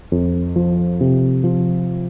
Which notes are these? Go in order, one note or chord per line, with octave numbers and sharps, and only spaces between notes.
F2
F3
C3
F3